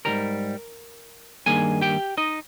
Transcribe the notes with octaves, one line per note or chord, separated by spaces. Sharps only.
G#2 D#3 G3 A#4 A#5
G2 D#3 A#3 G#4 G#5
G4 G5
D#4 D#5